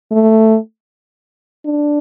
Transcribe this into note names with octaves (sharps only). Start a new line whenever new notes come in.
A3
D4